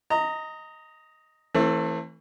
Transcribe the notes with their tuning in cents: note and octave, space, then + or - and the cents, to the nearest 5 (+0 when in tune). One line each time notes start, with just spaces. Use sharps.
D#5 +10 A#5 -20
E3 -10 A3 +25 C4 +40